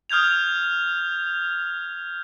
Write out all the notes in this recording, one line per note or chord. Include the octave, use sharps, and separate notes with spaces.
D#6 F6 G6 G#6 F7